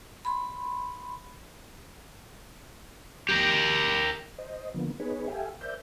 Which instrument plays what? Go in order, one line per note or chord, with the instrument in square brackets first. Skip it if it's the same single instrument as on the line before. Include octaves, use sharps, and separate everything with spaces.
[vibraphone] B5 C6
[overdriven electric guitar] G4 A#4
[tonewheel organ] C5 D#5
D3 F3 A#3 B3
B3 D#4 G#4 B4 C#5
G4 A4 E5 F5 G5 G#5
A#4 C5 D5 E5 G6